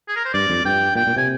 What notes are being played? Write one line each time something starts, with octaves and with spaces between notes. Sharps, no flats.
G#4
A#4
C5
G2 D5
F2
G2 G5
A#2 G5
A#2
C3 G#5